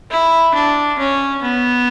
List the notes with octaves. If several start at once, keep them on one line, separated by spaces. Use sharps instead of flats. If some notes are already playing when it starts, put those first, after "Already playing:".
E4
D4
C#4
B3